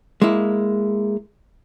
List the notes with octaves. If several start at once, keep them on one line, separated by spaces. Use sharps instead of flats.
G#3 A#3 E4